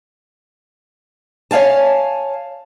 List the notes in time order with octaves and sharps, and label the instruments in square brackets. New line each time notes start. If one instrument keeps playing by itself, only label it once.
[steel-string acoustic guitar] C#5 D5 F5 G#5 A5